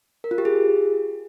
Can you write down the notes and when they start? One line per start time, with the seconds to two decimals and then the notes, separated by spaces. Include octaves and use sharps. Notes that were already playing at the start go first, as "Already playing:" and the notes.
0.24 A#4
0.31 F4
0.38 G4
0.45 G#4